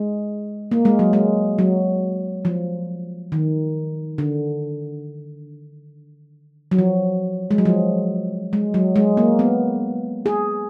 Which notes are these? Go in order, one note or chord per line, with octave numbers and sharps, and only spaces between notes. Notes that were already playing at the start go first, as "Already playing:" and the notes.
Already playing: G#3
A#3
G#3
F#3
G#3
F#3
F3
D#3
D3
F#3
F3
G#3
F#3
F3
G#3
F#3
G#3
A#3
B3
G#4